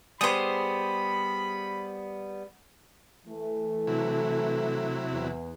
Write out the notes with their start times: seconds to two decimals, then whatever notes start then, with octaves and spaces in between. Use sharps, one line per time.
0.21 G3 B3 G4 G#4 C5 B5 D#6
3.27 E3 A3
3.87 C3 F#3 E4
5.11 E2